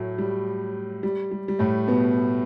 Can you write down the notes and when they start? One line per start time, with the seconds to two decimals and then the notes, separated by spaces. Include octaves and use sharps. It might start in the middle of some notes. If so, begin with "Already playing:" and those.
Already playing: A2 F#3 A3
0.18 G3
1.03 G3
1.31 G3
1.48 G3
1.59 A2 A3
1.87 B2 B3